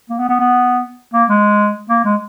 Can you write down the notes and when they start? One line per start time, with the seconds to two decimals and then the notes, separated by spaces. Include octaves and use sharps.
0.10 A#3
0.19 B3
0.29 B3
0.40 B3
1.14 A#3
1.30 G#3
1.89 A#3
2.05 G#3